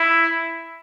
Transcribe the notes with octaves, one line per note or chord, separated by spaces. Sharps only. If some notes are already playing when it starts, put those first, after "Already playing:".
Already playing: E4